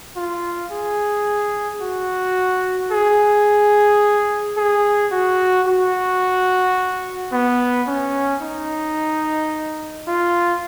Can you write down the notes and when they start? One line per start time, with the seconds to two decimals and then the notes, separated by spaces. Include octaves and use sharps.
0.16 F4
0.71 G#4
1.81 F#4
2.91 G#4
4.57 G#4
5.12 F#4
5.67 F#4
7.32 B3
7.87 C#4
8.42 D#4
10.07 F4